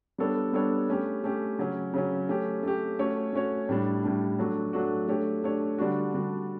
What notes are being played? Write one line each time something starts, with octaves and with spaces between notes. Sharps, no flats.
G3 B3 D4 A4 C#5
G3 B3 D4 A4 C#5
A3 C#4 G4
A3 C#4 G4
C#3 F#3 C#4
C#3 F#3 C#4
A3 C#4 G4
A3 C#4 G4
A3 C#4 F#4 C#5
A3 C#4 F#4 C#5
A2 G3 D4
A2 G3 D4
F#3 A3 D4 F#4
F#3 A3 D4 F#4
A3 D4 G4 C#5
A3 D4 G4 C#5
D3 G3 D4 F#4
D3 G3 D4 F#4